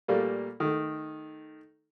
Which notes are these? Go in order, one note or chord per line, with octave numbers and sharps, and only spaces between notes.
A#2 G3 A3 A#3
D#3 A3